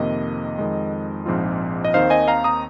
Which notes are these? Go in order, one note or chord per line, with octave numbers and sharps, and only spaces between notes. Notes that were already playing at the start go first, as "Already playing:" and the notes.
Already playing: F2 C3 D#3 A#3 D#5
F2 D#3 G#3
A#1 G#2 F3 C4 F4
D#5
D#2 D#3 C4 D#4 C5 F5
D#5 G#5
F5 A#5
A#5 D#6